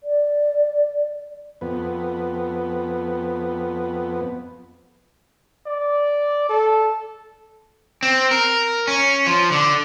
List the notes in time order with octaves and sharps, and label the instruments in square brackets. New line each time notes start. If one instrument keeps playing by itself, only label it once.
[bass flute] D5
[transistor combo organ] F2 B3
[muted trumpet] D5
A4
[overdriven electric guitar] C4
A#4
C#4
F3
D3